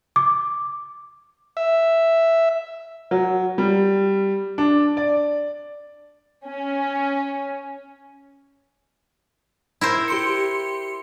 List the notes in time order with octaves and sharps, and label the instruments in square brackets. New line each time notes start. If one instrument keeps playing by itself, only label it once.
[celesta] D6
[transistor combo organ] E5
[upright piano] F#3
G3
D4
D5
[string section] C#4
[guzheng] E4 A#4 C5
[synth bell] G4 C6 C#7